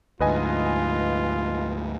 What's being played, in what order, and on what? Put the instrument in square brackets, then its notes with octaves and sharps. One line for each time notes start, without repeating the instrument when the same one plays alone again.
[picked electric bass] D2 G#2 [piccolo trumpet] F4 [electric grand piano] B4 D#5 G#5